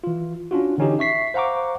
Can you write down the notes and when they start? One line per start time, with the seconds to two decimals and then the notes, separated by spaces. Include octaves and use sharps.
0.04 E3 F4
0.51 C#4 D4 F4 F#4
0.78 D3 E3 C#4 D#4 G4
0.99 E5 C#6 B6 C7
1.34 C5 F5 F#5 A#5 C#6 D6